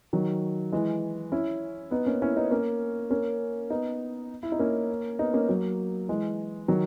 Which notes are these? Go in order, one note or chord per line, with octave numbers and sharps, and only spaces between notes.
D#3 F#3
E3 G#3
C#4 E4
B3 D#4
A#3 C#4
C#4 E4
B3 D#4
A#3 C#4
A#3 C#4
B3 D#4
E4
D#4
A#3 C#4
B3 D#4
A#3 C#4
F#3 A#3
E3 G#3
D#3 F#3